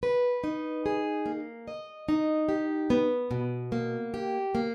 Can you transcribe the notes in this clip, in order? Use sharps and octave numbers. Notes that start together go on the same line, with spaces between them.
B4
D#4
G#4
A#3
D#5
D#4
G4
B3
B2
A#3
G4
A#3